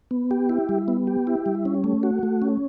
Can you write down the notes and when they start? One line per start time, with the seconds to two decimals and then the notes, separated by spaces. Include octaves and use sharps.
0.11 B3
0.31 G4
0.49 E4
0.69 G3
0.88 B3
1.07 G4
1.27 E4
1.46 G3
1.65 C#4
1.84 A3
2.03 F#4
2.23 A3
2.42 C#4